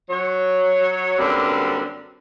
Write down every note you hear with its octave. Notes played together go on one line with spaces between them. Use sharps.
F#3 C#5
F#2 D3 G3 A#3 C4 B4